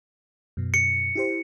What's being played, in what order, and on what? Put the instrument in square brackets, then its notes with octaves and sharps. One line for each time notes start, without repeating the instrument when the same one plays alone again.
[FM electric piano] F#2 B2
[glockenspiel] C#7
[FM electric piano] E4 G4 C5